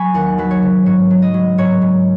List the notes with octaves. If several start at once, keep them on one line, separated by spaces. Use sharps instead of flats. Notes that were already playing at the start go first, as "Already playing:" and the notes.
Already playing: F#3 G#5 B5 C#6
D#2 F#5
F#3 B4
C#5
C#3
G#2 C#5
F#3
D#5
F#3
G#2 C#5
G#2